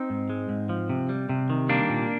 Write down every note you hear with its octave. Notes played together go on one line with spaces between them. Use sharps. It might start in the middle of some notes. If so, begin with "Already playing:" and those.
Already playing: C4 D#4
G#2
G#3
G#2
F3
C3
G3
C3
D#3
G3 A#3 D4
A#2